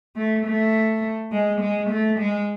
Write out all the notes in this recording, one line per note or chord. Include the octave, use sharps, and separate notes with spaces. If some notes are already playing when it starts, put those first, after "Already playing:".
A3
A3
G#3
G#3
A3
G#3